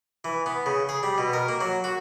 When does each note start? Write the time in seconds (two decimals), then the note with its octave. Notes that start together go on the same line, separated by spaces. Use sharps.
0.24 E3
0.46 B3
0.66 C#3
0.89 G#4
1.03 G3
1.18 B2
1.33 A#4
1.49 A#3
1.61 F#3
1.84 F#4